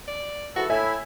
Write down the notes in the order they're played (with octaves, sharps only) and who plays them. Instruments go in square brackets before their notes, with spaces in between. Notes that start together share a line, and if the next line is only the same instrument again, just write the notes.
[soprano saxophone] D5
[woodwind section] G#2 E3 A4 [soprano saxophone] F#4
[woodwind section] A2 E4 [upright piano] E5 [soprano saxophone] G#5